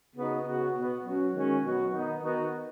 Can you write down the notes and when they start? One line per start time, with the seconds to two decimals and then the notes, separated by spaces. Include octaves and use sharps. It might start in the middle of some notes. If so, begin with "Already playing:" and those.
0.16 C#3 B3 D#4 F#4
0.46 C#3 B3 F#4
0.75 B2 B3 F#4
1.05 F#3 C#4 F#4
1.34 D#3 G#3 C#4 F#4
1.63 B2 F#3 B3 F#4
1.92 D#3 B3 D#4
2.22 D#3 B3 D#4 F#4